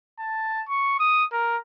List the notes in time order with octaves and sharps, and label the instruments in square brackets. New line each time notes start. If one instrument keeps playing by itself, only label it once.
[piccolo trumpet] A5
C#6
D#6
A#4